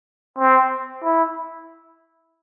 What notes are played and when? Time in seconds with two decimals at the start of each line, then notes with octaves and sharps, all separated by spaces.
0.39 C4
1.03 E4